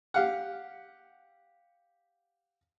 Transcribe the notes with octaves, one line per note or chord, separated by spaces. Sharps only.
G4 F5 F#5